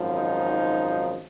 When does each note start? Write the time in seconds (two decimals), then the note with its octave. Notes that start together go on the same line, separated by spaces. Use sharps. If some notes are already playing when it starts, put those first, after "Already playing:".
Already playing: G#1 F#2 F3
0.15 D#4